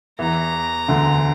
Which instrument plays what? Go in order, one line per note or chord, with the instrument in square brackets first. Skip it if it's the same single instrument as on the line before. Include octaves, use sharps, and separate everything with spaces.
[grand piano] E2 E3 [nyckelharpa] A#5
[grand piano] D2 D3